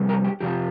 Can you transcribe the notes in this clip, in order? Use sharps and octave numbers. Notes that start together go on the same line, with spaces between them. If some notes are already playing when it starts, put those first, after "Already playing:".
Already playing: F2 C3 G3
A#4
G4
F2 C3 F3 G4